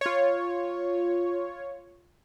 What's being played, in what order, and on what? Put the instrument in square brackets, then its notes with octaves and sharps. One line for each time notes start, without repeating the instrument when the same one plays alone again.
[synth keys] F4 C#5